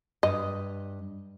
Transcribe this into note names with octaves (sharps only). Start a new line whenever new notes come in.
G2 D#5